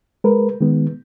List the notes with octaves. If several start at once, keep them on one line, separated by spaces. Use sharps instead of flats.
G#3 A#4 B4
D#3 G#3 B3